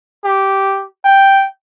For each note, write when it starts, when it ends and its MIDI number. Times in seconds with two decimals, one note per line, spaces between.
0.24 0.85 67
1.05 1.47 79